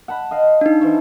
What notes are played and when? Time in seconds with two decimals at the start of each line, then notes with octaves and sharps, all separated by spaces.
0.08 F#5 A5 B5
0.31 D#5 F5
0.61 D4 D#4
0.80 E3 C5 C#5